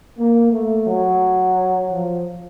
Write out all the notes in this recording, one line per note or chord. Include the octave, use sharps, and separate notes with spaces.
A#3
A3
F#3
F3